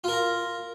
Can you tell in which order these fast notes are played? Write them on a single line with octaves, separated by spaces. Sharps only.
F4 A#4 A#5